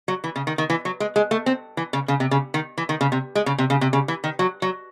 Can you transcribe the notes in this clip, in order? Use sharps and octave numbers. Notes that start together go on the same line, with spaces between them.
F#3
E3
C#3
D#3
D#3
E3
F#3
G#3
G#3
A3
C4
E3
C#3
C#3
C3
C#3
D#3
E3
D#3
C#3
C3
G#3
C#3
C3
C#3
C3
C#3
E3
D#3
F#3
F#3